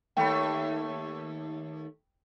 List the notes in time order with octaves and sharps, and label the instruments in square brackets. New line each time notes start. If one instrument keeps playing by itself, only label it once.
[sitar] D#2 A3 [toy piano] G5 B5